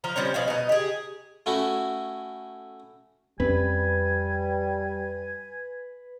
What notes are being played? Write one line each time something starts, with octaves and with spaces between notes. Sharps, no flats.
F3 F5 A#5
F3 G3 C4 C#4
B2 F5 G#5
B2 D#4
G4 G#4
A3 C#4 E4 F#4
F2 G3 C4 C#4 B4 G#5